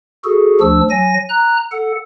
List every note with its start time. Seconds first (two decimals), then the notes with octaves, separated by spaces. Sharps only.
0.24 F#4 G#4 A4
0.61 D2 F3 D4 E6
0.90 F#3 G#5 A#6
1.29 A#5 F#6
1.72 A4 F#5